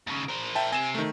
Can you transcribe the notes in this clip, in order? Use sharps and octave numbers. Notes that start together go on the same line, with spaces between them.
D#2 C#3
A#4 C5
E5 G5 A5
C3 C4 G#5 E7
D#3 A3